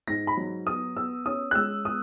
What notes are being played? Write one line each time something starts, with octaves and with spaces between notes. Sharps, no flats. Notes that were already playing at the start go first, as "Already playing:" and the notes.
G#2 A#6
B5
F#3
B3 D#6
B3 E6
C#4 D#6
F#6
G#3 E6
B3 D#6